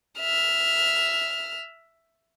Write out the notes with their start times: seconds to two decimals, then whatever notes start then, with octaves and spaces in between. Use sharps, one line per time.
0.20 E5 F6